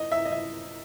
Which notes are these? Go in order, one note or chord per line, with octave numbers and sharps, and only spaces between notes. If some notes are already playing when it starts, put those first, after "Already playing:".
Already playing: D#5
E5
D#5
E5